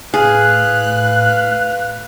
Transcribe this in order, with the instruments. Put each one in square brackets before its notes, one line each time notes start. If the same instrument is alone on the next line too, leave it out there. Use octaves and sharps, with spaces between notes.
[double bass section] A2 [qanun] G#4 [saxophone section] B4 F5 [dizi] F#6